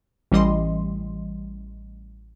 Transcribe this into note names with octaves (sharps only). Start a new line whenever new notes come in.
A1 E3 G3 D#5 C6